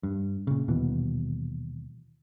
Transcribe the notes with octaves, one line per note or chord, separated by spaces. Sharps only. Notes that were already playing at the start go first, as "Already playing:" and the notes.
G2
A#2 C#3
D#1 D#2 B2 E3